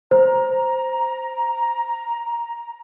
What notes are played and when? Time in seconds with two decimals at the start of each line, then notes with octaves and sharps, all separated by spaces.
0.11 C5 A#5